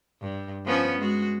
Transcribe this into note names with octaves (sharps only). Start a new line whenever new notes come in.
G2
F3 B3 C#4
G#3 F#4